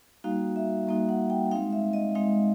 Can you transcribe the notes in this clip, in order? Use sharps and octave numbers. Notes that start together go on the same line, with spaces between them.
G3 A#3 D#4 F#4 F5
E5
G3 A#3 D#4 F#4
F#5
G5
G#3 C4 D#4 F5
E5
D#5
G#3 C4 D#4 F5